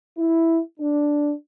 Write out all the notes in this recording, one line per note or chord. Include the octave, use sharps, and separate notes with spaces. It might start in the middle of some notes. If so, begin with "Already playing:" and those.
E4
D4